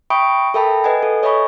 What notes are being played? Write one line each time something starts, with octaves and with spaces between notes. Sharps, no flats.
E5 G5 B5 C#6 D#6 D7
A4 A#4 E5 G5 A5 B5
B4 D#5 F#5 G#5
A4
C#5 D#5 E5 G#5 B5 C#6